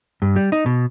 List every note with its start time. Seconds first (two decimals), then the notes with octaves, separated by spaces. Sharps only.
0.22 G2
0.36 G3
0.52 D#4
0.66 B2